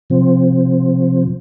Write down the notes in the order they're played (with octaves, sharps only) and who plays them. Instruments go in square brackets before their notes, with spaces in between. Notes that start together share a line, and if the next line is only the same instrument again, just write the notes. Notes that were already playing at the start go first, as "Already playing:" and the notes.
[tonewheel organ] C3 F3 C4